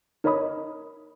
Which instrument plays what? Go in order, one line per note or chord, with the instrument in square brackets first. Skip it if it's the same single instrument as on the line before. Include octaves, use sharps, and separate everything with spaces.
[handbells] D#4 A#4 C#5 D#5 B5 D#6